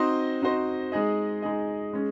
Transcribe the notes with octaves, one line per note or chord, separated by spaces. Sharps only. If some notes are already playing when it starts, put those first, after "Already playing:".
Already playing: C4 D#4 F#4 C5 D#5
C4 D#4 F#4 C5 D#5
G#3 D#4 G#4 D#5
G#3 D#4 G#4 D#5
G#3 C#4 G#4